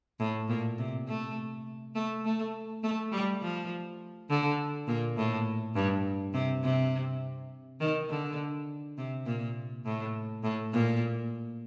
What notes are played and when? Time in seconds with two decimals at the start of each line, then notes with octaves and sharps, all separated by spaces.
0.20 A2
0.49 A#2
0.78 C3
1.07 A3
1.95 A3
2.25 A3
2.83 A3
3.12 G3
3.42 F3
4.29 D3
4.88 A#2
5.17 A2
5.75 G2
6.34 C3
6.64 C3
7.80 D#3
8.10 D3
8.98 C3
9.26 A#2
9.85 A2
10.44 A2
10.73 A#2